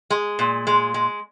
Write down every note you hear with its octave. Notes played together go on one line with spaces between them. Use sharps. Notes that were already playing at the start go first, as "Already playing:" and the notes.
G#3
A#2
G#3
G#3